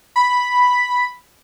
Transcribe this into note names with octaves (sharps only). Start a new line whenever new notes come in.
B5